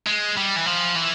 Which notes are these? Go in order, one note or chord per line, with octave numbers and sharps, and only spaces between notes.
G#3
G3
E3
F3
E3